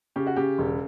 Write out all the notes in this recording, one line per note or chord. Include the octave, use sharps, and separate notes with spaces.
C#3 G4
F#4
C#3 G4
E1